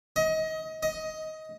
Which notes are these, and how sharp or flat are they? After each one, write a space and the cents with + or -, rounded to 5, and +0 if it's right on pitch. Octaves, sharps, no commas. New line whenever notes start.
D#5 +25
D#5 +15